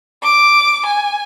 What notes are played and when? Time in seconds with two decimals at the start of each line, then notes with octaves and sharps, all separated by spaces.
0.23 D6
0.86 G#5